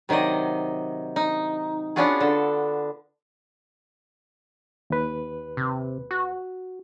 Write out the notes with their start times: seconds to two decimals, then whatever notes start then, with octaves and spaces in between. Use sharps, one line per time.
0.09 C3 D#3 F#3 D5 D#5
1.16 D#4
1.96 B3 C#4 D4 F4 F#4 G#4
2.20 D3 A4
4.90 D#2 B4
5.57 C3
6.11 F#4